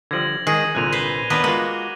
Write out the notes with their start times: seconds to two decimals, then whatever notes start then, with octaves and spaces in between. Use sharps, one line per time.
0.11 D3 F3 G3 G#6 A#6 F#7
0.47 D#3 G#3 G#4 G#6 A#6
0.75 C2 A#2 D3 F#6 D#7 F7
0.92 B4 C5 G7
1.30 D#2 B3 D4 A#4 B4 D6 B6
1.44 G#3 A#3 F4 F#4 F6 F#6